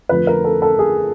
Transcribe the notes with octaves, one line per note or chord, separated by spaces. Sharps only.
F2 D3 F3 A3 B4
A#4
A4
A4
G#4